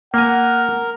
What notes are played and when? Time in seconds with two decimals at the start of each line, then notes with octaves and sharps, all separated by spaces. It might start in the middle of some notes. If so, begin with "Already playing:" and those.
0.14 A#3 A#4 F#5 G#5